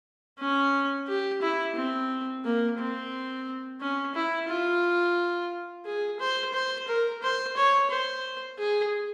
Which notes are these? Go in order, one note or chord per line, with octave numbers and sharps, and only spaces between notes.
C#4
G4
E4
C4
A#3
C4
C#4
E4
F4
G#4
C5
C5
A#4
C5
C#5
C5
G#4